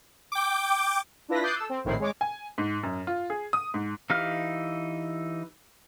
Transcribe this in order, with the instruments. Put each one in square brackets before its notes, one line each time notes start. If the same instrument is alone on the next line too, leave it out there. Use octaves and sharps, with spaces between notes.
[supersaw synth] G5 D6
[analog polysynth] D4 E4 F4 B4 A#6 B6
D6 D#6 F#6 G6 A6 C7
A4 E6
C4
A#1 A2 D#3 C4 E4 C7
G#3 C#5 D6
[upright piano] G#5
G#2
F#2
F4
G#4
D#6
G#2
[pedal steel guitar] E3 D#4 G4 F5 F6